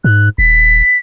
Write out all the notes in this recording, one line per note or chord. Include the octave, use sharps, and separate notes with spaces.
G#2 F#6
D#1 B6